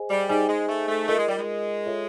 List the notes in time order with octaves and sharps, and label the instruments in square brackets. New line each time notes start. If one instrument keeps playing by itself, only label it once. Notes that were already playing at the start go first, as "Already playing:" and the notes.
Already playing: [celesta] G#4 C5 D#5 G#5
[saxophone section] G3
[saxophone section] G3 [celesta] D#4 G#4 C5 D#5 G#5
[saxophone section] G#3
A3
A3
[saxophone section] A3 [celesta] F4 A#4 D#5
[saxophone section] G#3
G3
G#3
[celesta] F4 A4 C#5 E5